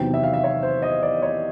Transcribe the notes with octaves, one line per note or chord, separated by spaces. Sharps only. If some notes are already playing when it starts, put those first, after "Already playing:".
Already playing: E2 C3 D#3 F#3 G5
E5
F5
E5
C#5
C5
D#5
D5
C#5